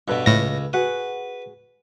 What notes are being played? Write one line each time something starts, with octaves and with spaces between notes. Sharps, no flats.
G2 B2 A4 B4 B5
C#2 A2 A#6
F#4 G#4 B4 F#5